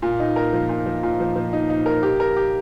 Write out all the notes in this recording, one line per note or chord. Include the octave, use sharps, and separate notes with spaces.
A#2
D#4
A#4
F3
A#2
F3
A#2
F3
F3
D#4
D#4
A#4
G4
A#4
G4